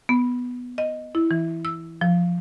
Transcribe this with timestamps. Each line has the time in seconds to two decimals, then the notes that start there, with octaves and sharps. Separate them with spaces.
0.09 B3
0.78 D#5
1.15 E4
1.31 E3
1.65 E6
2.01 F3